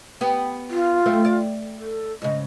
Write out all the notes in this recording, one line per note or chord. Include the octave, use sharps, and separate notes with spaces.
B3 G4
F4
F#2 A3 C4
D5
A4
G#2 C#3 D#5